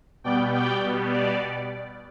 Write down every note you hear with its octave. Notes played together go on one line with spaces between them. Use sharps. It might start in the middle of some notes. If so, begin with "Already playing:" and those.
B2 G3 B3 D5 G5
D5 G5
B2 G3 B3
D5